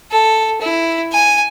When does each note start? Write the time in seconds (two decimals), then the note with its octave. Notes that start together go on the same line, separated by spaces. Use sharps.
0.12 A4
0.61 E4
1.12 G#5